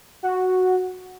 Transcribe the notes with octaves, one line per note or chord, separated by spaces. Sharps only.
F#4